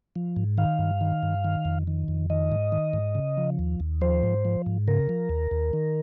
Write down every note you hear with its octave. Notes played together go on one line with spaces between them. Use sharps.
F3
G#2
D#3 F5
G2
D#3
G2
D#3
F2
D#3
F2
D#3 D#5
G#2
D#3
G#2
C#3
F3
D#2
D#2
F3 C5
G#2
F3
G#2
C#3 A#4
F3
D#2
D#2
D#3